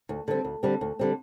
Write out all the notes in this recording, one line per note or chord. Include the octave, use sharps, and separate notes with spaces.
D2
D3 G3 C4
D2
D3 G3 C4
D2
D3 G3 C4